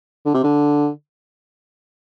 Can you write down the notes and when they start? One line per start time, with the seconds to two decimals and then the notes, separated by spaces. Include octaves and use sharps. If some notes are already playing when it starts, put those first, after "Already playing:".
0.25 D3
0.34 C3
0.43 D3